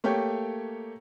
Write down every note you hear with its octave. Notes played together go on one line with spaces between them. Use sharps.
A3 A#3 G4 C#5 G5